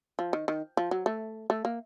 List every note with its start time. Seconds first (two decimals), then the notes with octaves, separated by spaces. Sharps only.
0.19 F3
0.33 D#3
0.48 D#3
0.77 F3
0.91 F#3
1.06 A3
1.50 A3
1.65 A#3